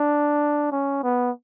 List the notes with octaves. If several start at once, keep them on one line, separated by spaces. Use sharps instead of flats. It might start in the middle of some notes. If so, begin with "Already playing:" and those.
Already playing: D4
C#4
B3